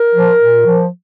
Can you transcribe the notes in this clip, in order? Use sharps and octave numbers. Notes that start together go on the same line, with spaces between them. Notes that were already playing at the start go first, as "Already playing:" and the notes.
Already playing: A#4
F3
A#2
F3